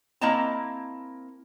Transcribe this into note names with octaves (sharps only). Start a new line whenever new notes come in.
A#3 C4 E4 D#5 A5 A#5